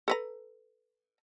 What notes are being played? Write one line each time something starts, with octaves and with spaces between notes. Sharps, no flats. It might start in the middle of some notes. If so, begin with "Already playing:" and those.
A4 B4 A#5